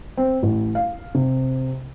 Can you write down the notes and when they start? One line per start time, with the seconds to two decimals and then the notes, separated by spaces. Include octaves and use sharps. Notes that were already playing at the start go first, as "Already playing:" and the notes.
0.17 C4
0.43 A1
0.75 F5
1.14 C3